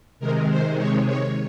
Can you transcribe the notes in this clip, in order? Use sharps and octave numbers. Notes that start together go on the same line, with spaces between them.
C3 D#3 G#3 A#4
C5
C#5
C#5